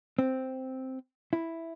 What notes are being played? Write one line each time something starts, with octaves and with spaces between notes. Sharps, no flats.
C4
E4